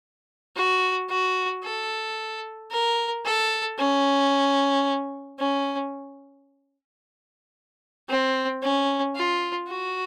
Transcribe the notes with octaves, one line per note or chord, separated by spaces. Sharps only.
F#4
F#4
A4
A#4
A4
C#4
C#4
C4
C#4
F4
F#4